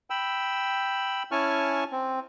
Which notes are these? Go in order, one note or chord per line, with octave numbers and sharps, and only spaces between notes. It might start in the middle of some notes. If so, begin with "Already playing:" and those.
G5 B5 E6
C#4 E4 G#5 A5 C#6 F6
C4